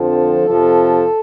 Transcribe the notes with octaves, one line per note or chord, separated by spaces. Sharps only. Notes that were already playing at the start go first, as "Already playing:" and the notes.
Already playing: F2 D3 F3 C4 A4
F2 C3 F3